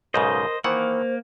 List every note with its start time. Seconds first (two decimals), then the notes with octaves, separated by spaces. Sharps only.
0.14 B1 G#2 C#3 A#4 C5 D#5
0.64 D#3 E3 A#3 C5 F#5